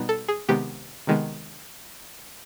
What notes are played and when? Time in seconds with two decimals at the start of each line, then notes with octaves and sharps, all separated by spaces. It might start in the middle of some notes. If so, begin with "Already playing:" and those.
Already playing: B2 G3 B3 D#4
0.09 A4
0.29 G#4
0.49 C3 D#3 G#3 B3 G4
1.07 C3 D#3 G#3 B3